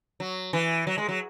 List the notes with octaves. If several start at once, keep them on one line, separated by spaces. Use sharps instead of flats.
F#3
E3
F#3
G#3
F#3